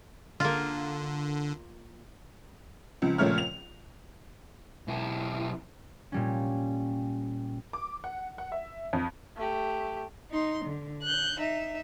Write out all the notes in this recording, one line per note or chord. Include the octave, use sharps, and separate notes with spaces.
D3 A#3 F4
C#2 F3
C#2 A#2 F3 A3 C#5 F6
F7
B1 E4
A#2 G3 C#4
D6
F#5
F#5
E5
F2
A3 G4
D#4 C6
D3
F#6 G6
D#4 E5